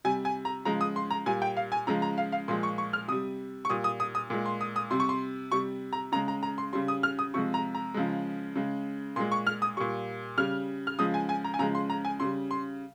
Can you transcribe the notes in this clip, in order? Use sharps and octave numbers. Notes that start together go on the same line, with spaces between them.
C3 G3 G#5
G#5
A#5
C#3 F3 G#3 A#5
D#6
C6
A#5
A#2 G3 G#5
G5
F5
G#5
C#3 F3 G#3 A#5
A#5
F5
F5
A#2 F3 G#3 C6
C#6
C#6
F6
C3 G3 D#6
C#6
A#2 G3 D#6
D#6
D#6
D#6
A#2 G#3
C6
D#6
D#6
C3 G3 C6
C#6
C6
C3 G3 C#6
A#5
C#3 G#3 A#5
A#5
A#5
C6
C#3 G3 C6
D#6
F6
D#6
C3 F3 G#3 C#6
A#5
A#5
C#3 F3 G#3
C#3 G#3
A#2 G#3 C6
C#6
F6
D#6
A#2 G3 C#6
C#3 G3 F6
F6
C#3 F3 G#3 D#6
G#5
G#5
A#5
G#5
C#3 F3 G#3 A#5
C6
A#5
G#5
C#3 G3 C6
C6